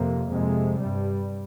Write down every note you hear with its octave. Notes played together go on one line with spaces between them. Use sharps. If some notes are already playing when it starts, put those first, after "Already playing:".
Already playing: F2 C3 A#3
F2 C3 G#3
G2 G3